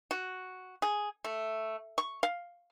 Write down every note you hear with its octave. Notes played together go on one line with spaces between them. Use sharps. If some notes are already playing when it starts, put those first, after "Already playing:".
F#4
G#4
A3
C#6
F5